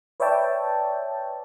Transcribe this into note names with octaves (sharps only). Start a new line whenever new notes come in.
B4 C#5 D5 E5 G5 A5